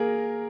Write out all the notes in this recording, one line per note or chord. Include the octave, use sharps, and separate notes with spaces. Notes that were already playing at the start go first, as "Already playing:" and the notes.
Already playing: A#3 G#4 A#4